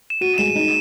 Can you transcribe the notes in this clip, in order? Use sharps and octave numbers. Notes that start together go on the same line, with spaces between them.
E7
F#4 D#7
G#3 E7
D#4